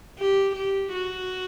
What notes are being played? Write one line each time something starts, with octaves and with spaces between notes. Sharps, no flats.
G4
G4
F#4